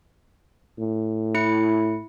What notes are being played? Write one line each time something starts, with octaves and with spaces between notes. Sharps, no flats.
A2
E4 C#7